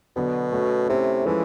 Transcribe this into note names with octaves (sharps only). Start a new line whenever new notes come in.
B2 D3 F#3 B3 D4
A3 C#4 F#4
C3 A3 C#4 E4
E3 F3 G#3 C#4 E4 A4